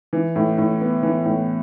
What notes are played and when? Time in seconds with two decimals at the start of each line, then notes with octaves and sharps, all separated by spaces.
0.13 E3
0.36 A2
0.58 A2
0.81 B3
1.03 E3
1.25 A2